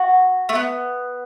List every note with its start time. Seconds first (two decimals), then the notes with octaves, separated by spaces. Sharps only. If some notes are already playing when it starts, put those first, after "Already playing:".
Already playing: F#4
0.49 A3
0.55 B3